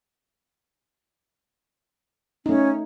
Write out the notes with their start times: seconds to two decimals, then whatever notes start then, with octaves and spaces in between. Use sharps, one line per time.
2.46 A3 C#4 D#4